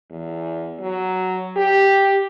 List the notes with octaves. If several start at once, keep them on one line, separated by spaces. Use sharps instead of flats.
E2
F#3
G4